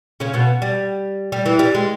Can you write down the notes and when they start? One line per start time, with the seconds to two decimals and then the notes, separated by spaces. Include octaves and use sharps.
0.20 C#3 C#4
0.34 B2 B3
0.62 G3
1.32 G3
1.46 E3
1.59 G3
1.75 G#3